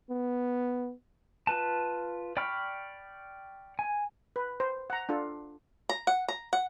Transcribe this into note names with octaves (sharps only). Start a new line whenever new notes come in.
B3
F4 B4 A5
D5 G5 B5 C#6 F6
G#5
B4
C5
F#5 A#5
D4 F4 A4
A#5
F#5
A#5
F#5